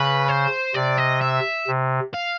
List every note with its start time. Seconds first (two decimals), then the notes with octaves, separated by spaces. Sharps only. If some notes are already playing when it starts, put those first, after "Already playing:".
Already playing: C#3 B4
0.29 C5
0.75 C3 D5
0.98 D#5
1.22 E5
1.67 C3
2.14 F5